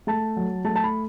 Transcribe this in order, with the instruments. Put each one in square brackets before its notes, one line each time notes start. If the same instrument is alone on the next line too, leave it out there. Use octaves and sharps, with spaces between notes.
[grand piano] A3 A5
F#3
A3 A5
A5
B5